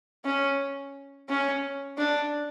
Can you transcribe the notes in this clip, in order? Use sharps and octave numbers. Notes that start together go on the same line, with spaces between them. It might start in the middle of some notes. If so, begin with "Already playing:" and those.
C#4
C#4
D4